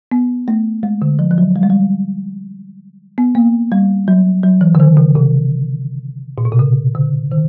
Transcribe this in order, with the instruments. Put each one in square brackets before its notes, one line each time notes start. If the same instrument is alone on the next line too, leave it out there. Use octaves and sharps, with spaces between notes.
[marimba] B3
A3
G#3
D3
F3
F3
F#3
G3
G#3
G3
B3
A#3
G3
F#3
F#3
E3
D3
D#3
C#3
C3
A#2
B2
C3
C#3
D3
D#3